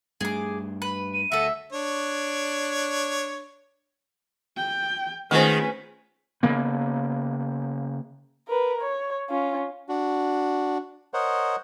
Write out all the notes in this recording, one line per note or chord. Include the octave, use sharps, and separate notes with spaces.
G2 A3 G#4 D6
B4
D#7
D2 F#4 A4 E5
D4 C#5
G5
D#3 G#3 A3 C#4 F4 B4 C5
C#3 A#3 B3
A#4 B4
C#5
C#4 F4
D4 F#4
A#4 C5 C#5 D#5 F#5